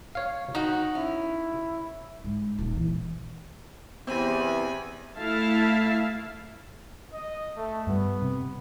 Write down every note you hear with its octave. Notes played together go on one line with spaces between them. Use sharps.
C#5 F5
D#3 D#4 F#4
C#4 E4
G#2
D#1
E3
E2 B3 C4 G4 G#5 B5
A3 E4 E5 F5 A5
D#5
A3
G2 G3 B3
C3